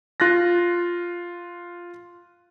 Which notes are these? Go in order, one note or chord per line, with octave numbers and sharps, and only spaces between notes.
F4 F#6 A6 A#6